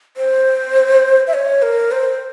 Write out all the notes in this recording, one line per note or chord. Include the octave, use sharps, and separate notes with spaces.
C5
E5
C#5
A#4
C5